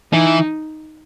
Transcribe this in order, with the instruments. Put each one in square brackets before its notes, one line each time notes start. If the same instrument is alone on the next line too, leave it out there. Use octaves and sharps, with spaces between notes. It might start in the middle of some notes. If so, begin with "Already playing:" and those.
[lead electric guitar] E3 [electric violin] D#4